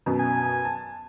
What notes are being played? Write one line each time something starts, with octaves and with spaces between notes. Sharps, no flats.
F#2 B2
G#5
A5